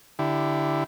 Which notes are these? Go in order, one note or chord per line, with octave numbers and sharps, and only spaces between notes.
D3 E4 G4